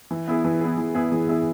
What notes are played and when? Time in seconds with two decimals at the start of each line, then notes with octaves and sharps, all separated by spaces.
0.11 E3
0.28 B3 E4 G#4
0.44 E3
0.61 B3 E4 G#4
0.78 E3
0.94 B3 E4 G#4
1.12 E3
1.28 B3 E4 G#4